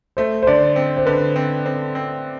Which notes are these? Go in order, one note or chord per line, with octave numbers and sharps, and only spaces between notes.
A3 C5
C5
D3 D5
C4
C5
D3 B4
C4
C4
C4